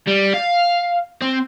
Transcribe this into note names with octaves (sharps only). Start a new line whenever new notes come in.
G3
F5
C4